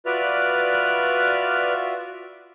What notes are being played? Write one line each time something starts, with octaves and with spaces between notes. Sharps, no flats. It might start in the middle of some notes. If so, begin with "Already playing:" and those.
F4 F#4 B4 D5 E5 F6